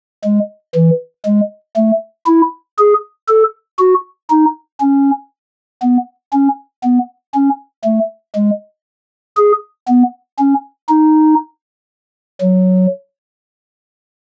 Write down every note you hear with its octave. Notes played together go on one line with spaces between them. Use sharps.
G#3
E3
G#3
A3
E4
G#4
A4
F#4
D#4
C#4
B3
C#4
B3
C#4
A3
G#3
G#4
B3
C#4
D#4
F#3